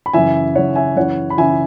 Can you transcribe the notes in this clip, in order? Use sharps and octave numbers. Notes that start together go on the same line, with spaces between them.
B5
F#2 C#3 E3 E5 G#5
F#2 C#3 E3 C#5 F#5
E5 G#5
F#2 C#3 E3 C#5 F#5
B5
C#3 E3 E5 G#5